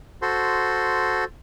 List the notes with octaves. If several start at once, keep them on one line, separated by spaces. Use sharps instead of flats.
F#4 A4 C5 C6